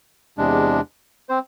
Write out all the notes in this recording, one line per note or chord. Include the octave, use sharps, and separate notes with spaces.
E2 C3 G#3 D4
C4 C5